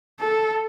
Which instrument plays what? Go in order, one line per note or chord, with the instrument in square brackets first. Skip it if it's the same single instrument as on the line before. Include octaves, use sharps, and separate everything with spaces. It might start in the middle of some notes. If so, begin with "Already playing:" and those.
[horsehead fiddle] A4